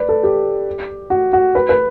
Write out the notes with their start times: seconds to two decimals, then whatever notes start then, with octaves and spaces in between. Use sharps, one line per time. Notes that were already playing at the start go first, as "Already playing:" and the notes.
Already playing: B4 D5
0.09 A4
0.23 G4
1.10 F#4
1.33 F#4
1.55 B4
1.69 B4